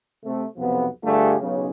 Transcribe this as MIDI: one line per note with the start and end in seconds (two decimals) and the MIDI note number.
0.25 0.45 48
0.25 0.45 57
0.57 0.87 35
0.57 0.87 41
0.57 0.87 48
0.57 0.87 53
0.57 0.87 59
1.04 1.35 43
1.04 1.35 50
1.04 1.35 57
1.04 1.35 65
1.04 1.35 67
1.04 1.35 68
1.40 1.70 35
1.40 1.70 49